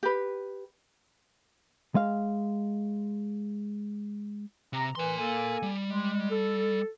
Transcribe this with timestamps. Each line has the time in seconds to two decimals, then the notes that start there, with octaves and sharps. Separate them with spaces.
0.03 G4 B4
1.95 G#3 F5
4.73 C3 A#5
4.95 E3 A#4 C6
5.18 A#3 A4 G#5
5.62 G3
5.88 G#3
6.30 A4